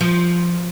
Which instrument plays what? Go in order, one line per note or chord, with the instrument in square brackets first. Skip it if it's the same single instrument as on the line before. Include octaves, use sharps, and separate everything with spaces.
[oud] F3